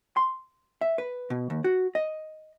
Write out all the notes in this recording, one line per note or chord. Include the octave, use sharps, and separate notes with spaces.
C6
E5
B4
B2
D#2
F#4
D#5